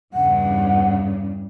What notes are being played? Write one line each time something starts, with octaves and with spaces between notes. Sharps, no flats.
E2 G2 C#3 F#5